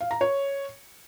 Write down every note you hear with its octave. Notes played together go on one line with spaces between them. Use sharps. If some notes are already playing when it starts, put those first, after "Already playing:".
F5
A#5
C#5